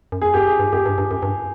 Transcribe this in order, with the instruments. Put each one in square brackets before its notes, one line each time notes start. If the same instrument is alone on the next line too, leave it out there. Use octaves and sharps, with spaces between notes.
[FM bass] F#2
[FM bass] F2 [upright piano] G#4
[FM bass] F#2 [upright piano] G4
[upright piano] G#4
[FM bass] G2
[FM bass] F#2 [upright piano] G4
[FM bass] G2
G2
F#2
G2